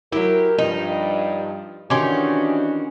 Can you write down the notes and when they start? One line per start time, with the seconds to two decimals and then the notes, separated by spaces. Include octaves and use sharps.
0.12 F#3 E4 G4 A#4
0.58 G2 F3 D#4
1.90 D#3 E3 C#4 D4 F#4 G4 C6 D6